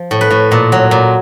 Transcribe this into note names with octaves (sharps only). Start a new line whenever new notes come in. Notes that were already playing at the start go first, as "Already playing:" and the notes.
Already playing: F3
A2
B4
A2
A#2
F#3
A#2